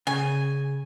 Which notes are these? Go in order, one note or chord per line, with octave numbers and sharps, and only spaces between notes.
C#3 G#5